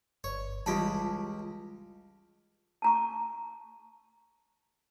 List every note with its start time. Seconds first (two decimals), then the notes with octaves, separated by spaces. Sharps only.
0.24 G1 C#5
0.66 C#2 E3 G3 F4 D#5 A5 B5
2.82 A5 A#5 C#6